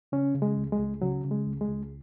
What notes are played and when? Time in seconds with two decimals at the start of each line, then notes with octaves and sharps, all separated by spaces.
0.12 C#3 C#4
0.34 C#3
0.42 G#3
0.58 C#2
0.72 G#3
0.79 C#2
1.02 C#3 F#3
1.24 C#3
1.31 G#3
1.46 C#2
1.61 G#3
1.68 C#2